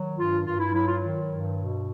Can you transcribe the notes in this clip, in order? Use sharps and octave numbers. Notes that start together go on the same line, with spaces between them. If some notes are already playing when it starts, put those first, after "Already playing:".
Already playing: D#3 F#3
G2 F4
G2 F4
E4
F#3 E4
F4
D#3
G2
B2